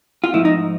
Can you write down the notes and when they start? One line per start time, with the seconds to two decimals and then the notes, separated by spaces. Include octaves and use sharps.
0.24 F4
0.33 G#2 F3 A3 E4
0.45 D#4